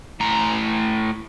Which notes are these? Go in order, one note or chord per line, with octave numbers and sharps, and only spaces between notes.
A2 A#5